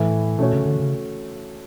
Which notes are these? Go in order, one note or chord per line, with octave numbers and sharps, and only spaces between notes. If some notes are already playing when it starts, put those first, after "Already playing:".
Already playing: A2 E3 A3 E4
B2 A3 C#4 F#4 C#5
C#3
D3
C#3